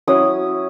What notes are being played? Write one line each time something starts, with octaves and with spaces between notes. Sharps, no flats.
F#3 C#4 E4 D#6